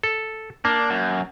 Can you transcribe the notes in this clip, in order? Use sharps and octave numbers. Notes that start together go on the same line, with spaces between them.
A4
A#3 D4
F#2